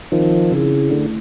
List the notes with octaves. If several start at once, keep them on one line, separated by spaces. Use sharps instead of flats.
D#3 F3 C4
C#3 E4 G#4
D3 A3